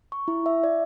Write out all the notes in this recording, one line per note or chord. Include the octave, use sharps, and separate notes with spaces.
C#6
E4
E5
D5